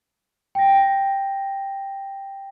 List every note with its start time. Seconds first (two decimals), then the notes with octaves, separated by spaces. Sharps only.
0.55 G5 A#6